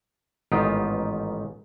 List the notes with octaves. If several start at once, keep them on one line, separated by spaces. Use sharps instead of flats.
A1 G#2 D#3 B3 F4 G4